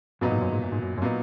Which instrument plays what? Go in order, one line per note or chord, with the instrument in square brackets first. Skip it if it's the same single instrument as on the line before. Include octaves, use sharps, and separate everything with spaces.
[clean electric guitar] F#2 [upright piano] A#2 F#3 B3 D#4
[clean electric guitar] G#2
F#2
G#2
F#2
G#2
F#2
F#2
[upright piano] A#2 F#3 B3 D#4